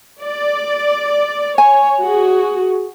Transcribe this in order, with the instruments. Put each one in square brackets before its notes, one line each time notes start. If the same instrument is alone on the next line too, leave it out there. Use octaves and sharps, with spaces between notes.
[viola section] D5
[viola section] C#5 [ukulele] G#5
[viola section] F#4 G#4